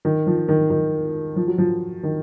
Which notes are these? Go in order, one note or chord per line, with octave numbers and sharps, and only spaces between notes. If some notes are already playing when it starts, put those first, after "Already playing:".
D#3
F3
D#3
D#3
F3
F#3
F3
D#3